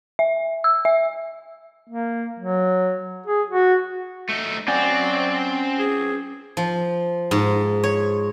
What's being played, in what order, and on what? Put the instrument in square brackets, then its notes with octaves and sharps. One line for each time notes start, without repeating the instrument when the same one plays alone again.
[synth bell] E5
E6
E5
[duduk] A#3
F#3
G#4
F#4
[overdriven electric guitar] A3 D#4
[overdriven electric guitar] C4 [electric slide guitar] C#4 F#5 G#5 [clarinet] D5
[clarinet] G#4
[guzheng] F3
G#2
C#5